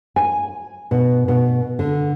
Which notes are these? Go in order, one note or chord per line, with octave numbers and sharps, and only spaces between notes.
G#5
B2
B2
D3